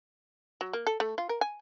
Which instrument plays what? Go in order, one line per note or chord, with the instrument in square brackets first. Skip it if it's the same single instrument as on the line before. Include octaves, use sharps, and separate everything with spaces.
[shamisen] F#3
A#3
A4
A3
F4
A#4
G#5